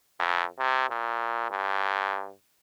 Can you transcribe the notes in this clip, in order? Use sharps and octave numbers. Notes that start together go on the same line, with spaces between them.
F2
C3
A#2
G2